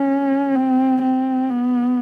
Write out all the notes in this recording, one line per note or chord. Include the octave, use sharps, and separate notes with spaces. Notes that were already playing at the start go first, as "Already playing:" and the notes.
Already playing: C#4
C4
C4
B3